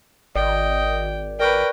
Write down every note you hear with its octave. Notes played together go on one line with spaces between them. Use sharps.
G#1 D5 D#5 G5
A#4 B4 D5 G5 C#6 F#6